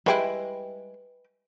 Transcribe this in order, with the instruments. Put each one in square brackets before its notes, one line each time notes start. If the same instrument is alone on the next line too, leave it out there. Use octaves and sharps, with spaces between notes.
[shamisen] G3 G#3 E4 [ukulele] B4 G5